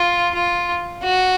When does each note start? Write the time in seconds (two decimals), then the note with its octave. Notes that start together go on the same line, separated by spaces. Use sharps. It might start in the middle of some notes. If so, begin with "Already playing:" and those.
Already playing: F4
0.34 F4
1.03 F#4